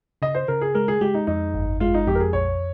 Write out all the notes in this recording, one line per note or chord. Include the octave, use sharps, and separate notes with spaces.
C#3 D#5
C5
C#3 A#4
G#4
G#3 A#4
G#4
G#3 G4
D#4
F2 D#4
G1
G#3 F4
D#4
F2 G4
A#4
G#4
A#1 C#5